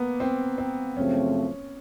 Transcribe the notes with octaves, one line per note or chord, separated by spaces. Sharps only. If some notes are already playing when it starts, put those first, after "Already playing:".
Already playing: A#3 B3
C4
C4
F#2 C#3 F3 A3 C4 C#4